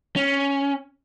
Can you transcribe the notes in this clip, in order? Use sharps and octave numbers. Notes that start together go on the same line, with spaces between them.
C#4